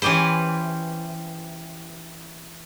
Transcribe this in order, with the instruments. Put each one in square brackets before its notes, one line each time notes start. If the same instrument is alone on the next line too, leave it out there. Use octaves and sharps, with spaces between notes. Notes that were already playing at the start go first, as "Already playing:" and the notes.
[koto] E3 C#4 G4 B4 C5